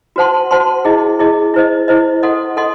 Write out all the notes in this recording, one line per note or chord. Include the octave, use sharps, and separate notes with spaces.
F#4 C5 F#5 A5 C6
F#4 C5 F#5 A5 C6
E4 G#4 D#5
E4 G#4 D#5
E4 C5 D#5
E4 C5 D#5
A4 D#5 F#5 C6
A4 D#5 F#5 C6